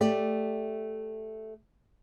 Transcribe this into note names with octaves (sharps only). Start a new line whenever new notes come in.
A3 G4 D5